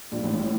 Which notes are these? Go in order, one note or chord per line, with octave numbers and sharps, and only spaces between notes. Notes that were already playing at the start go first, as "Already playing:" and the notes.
A#1 A#2
A1 A2
A2